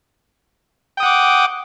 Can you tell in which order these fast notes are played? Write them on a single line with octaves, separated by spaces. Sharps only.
G5 D#6 F#5 D6